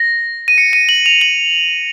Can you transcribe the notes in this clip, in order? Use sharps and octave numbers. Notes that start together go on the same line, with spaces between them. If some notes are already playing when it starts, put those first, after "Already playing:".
Already playing: A#6
D#7
C#7
D#7
F#7
F7
F#7